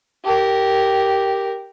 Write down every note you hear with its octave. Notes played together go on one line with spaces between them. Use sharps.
G4 A#4